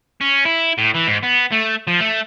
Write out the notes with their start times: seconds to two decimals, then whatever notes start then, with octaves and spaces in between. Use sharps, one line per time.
0.21 C#4
0.45 E4
0.78 A2
0.94 E3
1.07 G#2
1.23 B3
1.52 A3
1.87 F3
2.00 A3